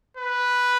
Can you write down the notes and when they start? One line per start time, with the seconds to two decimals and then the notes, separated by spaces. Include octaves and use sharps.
0.17 B4